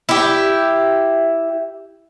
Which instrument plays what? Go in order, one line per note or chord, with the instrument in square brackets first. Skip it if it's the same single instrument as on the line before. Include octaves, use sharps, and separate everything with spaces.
[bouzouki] E4 G4